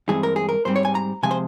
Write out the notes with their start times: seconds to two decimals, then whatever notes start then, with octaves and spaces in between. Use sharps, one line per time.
0.08 G2 E3 G#3 C4 G#4
0.23 A#4
0.36 G#4
0.49 A#4
0.65 G#2 G3 C4 C5
0.76 C#5
0.85 G#5
0.95 A#5
1.23 C3 F3 G#3 G#5
1.31 C5